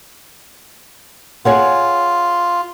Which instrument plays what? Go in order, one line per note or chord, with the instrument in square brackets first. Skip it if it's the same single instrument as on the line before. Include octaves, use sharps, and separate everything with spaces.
[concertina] F4 [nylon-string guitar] G#4 C#5 F#5